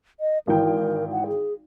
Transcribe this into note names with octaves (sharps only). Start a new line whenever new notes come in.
D#5
G#1 E3 A#4 G5
F#5
G#4